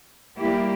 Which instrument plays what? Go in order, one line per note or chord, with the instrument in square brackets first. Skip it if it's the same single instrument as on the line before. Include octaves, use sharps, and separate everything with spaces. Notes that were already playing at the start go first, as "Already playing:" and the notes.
[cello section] G3 A#3 E4 G4